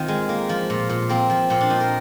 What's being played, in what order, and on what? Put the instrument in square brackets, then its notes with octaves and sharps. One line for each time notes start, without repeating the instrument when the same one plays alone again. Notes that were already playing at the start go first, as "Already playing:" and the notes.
Already playing: [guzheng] D#3 C4 F4
G#3
A#3
F3
A#2
A#2
A#3 C4
F3
A#2 C4
D4
A#2 D#4
A#4